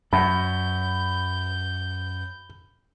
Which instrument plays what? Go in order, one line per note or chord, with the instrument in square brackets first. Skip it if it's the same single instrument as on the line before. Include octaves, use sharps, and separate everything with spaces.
[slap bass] F#2 [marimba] F#3 F#5 [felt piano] B5 [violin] G6